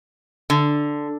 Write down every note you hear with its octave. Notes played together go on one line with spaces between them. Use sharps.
D3